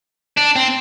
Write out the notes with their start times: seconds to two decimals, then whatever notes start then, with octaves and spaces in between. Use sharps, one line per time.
0.37 D4
0.56 C4